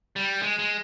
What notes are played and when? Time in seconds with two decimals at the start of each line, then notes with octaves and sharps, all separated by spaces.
0.16 G3
0.42 G#3
0.59 G#3